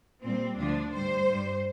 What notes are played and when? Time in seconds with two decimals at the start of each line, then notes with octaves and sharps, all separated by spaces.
0.23 A#2 G3 C4
0.58 D2 D3 F3 D4
0.93 G2 G3 C5
1.27 G2 G3